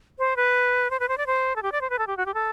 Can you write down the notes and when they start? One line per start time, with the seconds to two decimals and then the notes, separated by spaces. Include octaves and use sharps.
0.19 C5
0.36 B4
0.90 C5
1.00 B4
1.08 C5
1.18 D5
1.26 C5
1.56 A4
1.63 G4
1.72 D5
1.81 C5
1.90 B4
1.99 A4
2.07 G4
2.17 F#4
2.26 G4
2.34 A4